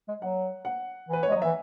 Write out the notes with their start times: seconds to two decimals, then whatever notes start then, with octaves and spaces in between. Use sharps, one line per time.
0.08 G#3
0.22 F#3 F#5
0.65 F#5
1.09 E3 B4
1.23 C#5
1.28 G#3
1.32 F#3 D#5
1.42 E3 E5